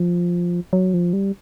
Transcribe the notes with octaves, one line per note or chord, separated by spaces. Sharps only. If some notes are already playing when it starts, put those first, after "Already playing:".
Already playing: F3
F#3
F3
G3